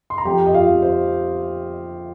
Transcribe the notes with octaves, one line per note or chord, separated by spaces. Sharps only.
C6
A#5
F2 G4 G5
D#5
F4 F5
F2
C5